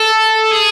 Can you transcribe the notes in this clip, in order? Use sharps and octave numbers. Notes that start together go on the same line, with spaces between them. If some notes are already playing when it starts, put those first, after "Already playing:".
Already playing: A4
G#4